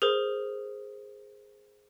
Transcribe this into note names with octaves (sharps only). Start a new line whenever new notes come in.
G#4 A#4 C5